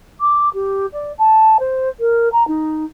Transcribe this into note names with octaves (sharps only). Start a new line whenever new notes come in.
D6
G4
D5
A5
C5
A#4
A#5
D#4